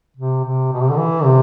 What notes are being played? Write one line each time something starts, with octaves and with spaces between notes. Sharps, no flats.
C3
C3
B2
C3
D3
E3
C3